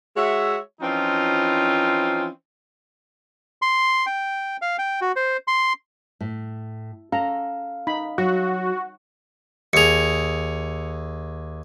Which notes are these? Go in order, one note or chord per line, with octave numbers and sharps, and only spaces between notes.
G#3 F#4 C#5 E5
E3 F3 C4 C#4 D#4 F4
C6
G5
F5
G5
F#4
C5
C6
A2
C#4 A4 F5 A#5
D#4 B5
F#3 F#4
D#2 G#4 C#7 F7